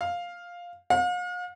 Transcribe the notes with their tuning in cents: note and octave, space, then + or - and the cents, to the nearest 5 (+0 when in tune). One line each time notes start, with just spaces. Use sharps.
F5 +5
F5 +45